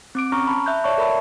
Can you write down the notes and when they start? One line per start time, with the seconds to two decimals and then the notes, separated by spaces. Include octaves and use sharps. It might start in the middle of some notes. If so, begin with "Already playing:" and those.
0.15 C4 D6 D7
0.32 C#4 A#5 C#6 F6
0.48 A5 B5
0.66 E5 F#6 G6
0.84 C#5 D5 E5 A5 C#6
0.98 A4 A#4 D5 E5 A5 B5